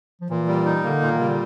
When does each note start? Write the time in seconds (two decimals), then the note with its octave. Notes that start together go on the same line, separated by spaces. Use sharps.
0.21 F3
0.30 A#2 E3
0.48 G3
0.65 D#4
0.84 D3 A#3
1.01 A#2
1.11 D#3
1.19 C#3 G3
1.29 D3